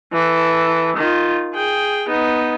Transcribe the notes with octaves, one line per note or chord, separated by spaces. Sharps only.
E3 A4
D#3 F4
G#4 G5
B3 D#4